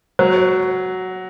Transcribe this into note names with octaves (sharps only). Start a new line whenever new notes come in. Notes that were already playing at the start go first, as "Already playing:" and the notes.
F#3